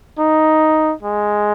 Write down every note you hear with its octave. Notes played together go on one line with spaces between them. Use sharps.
D#4
G#3